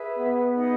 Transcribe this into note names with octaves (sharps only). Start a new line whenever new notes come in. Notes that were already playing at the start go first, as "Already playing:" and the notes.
Already playing: G#4 B4 E5
B3
D#4 G#4 D#5 F#5